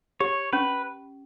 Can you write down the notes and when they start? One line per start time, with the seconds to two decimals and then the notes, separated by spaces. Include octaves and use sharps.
0.20 G4 C#5
0.53 C#4 B4